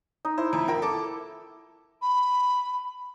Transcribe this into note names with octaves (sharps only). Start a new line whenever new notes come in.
D#4
E4 C5
F2 E5
F3 A#4 G5
A4 D6
B5